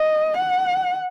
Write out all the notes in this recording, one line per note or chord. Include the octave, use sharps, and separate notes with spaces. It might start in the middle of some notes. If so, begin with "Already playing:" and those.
Already playing: D#5
F#5